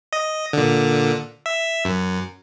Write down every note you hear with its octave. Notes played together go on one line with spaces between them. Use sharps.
D#5
A#2 D3
E5
F#2